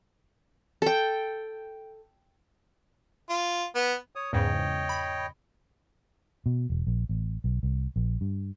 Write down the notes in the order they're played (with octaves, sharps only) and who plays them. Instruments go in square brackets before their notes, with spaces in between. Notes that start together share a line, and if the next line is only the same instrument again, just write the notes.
[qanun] A4 G5
[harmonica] F4
B3
[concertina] C#5 D#6
[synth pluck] E2 G#2 C#3 [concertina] C#5 D#5 G5
[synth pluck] B5
[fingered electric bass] B2
E1
A#1
A1
B1
C2
A#1
G2